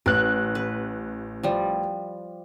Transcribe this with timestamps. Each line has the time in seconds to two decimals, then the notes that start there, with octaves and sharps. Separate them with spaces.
0.06 A1 A#4 F#6
0.55 B4
1.43 F3 G3